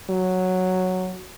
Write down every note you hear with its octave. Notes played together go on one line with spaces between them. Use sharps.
F#3